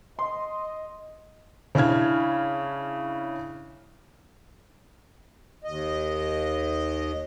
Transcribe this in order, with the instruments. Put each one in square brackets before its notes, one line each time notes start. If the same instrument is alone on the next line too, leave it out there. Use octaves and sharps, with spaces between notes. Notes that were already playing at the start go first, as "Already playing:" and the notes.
[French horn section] D#5 [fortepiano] C6
[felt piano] C#3 D4 E4 F6 G#6
[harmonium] D#2 D#5